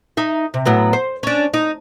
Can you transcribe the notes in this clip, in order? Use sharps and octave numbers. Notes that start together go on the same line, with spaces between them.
D#4 E5
C3
A2 F#3 B3
C5
C#4 D4
D#4